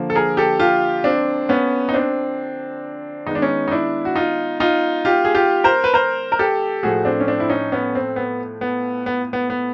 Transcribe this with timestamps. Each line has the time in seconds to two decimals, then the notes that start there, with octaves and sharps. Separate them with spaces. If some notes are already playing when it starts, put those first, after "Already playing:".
Already playing: D3 F3 A#3
0.10 A4
0.15 G#4 A#4
0.37 G4 A4
0.59 F4 G4
1.04 C4 D4
1.49 B3 C#4
1.89 D#4
1.94 C4 D4
3.27 D#3 G#3 B3 D#4
3.35 D4
3.42 C#4 D#4
3.68 D#4
3.71 D4 E4
4.05 F#4
4.16 D#4 F4
4.60 D#4 F4
5.05 F4 G4
5.25 G#4
5.35 F4 G4
5.64 A#4 C5
5.84 B4
5.94 A#4 C5
6.32 A#4
6.39 G4 A4
6.83 A2 F3 A3 F#4 G#4
7.05 C4 D4
7.20 C#4
7.28 C4 D4
7.40 E4
7.49 C#4 D#4
7.72 B3 C#4
7.95 C4
8.16 B3
8.61 B3
9.06 B3
9.33 B3
9.50 B3